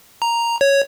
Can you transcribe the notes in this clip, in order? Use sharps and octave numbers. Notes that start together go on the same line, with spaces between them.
A#5
C#5